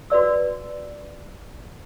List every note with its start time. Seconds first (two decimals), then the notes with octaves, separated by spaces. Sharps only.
0.10 F#4 B4 D5 E6